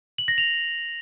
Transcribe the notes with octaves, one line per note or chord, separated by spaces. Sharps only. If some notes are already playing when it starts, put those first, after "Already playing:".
F#7
A#6
F7